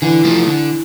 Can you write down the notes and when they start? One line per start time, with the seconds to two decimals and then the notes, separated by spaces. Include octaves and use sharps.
0.02 D3 E3
0.25 F3 A3
0.47 D3